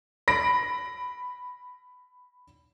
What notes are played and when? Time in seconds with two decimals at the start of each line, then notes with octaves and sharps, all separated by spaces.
0.28 B5 A#6 D7